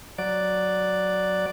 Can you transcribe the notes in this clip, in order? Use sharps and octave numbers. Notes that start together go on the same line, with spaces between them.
F#3 D5